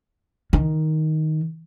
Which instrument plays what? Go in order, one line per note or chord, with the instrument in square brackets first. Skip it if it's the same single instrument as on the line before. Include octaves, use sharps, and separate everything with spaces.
[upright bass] D#3